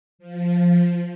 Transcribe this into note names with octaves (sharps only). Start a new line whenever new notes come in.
F3